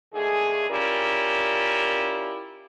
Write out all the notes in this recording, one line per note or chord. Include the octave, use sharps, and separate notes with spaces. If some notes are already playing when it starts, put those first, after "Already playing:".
D#2 D3 A3 G#4
C#4 E4 F4 G4 A#4 D5